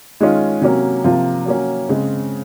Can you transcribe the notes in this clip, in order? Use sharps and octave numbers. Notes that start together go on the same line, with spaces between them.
D#3 G#3 C#4 F4
C3 F#3 A#3 C#4
C3 F3 A#3 F4
F#3 A#3 C#4
C#3 G#3 C4